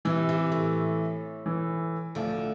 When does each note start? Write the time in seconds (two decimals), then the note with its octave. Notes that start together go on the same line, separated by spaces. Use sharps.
0.05 C3 E3
0.29 C3
0.52 A2
1.46 E3
2.15 D2 D3 F3